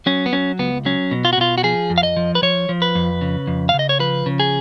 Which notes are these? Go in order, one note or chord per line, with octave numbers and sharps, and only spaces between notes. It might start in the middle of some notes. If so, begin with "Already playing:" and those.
F#3 C#4
B3
F#3 C#4
C#2 B3
F#3 C#4
B2
F4
F#4
B2 F4
F#4
F3 G#4
F2
F5
D#5
F3
B4
F3 C#5
F3
B4
F2
C#3
F2
F5
C#3
D#5
C#5
F3 B4
C#3
G#4